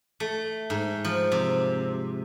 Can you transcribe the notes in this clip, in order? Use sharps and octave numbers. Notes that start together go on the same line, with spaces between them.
A3
G#2
F3
C3